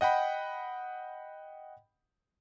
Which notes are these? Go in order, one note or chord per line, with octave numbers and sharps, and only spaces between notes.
D#5 F#5 G5 B5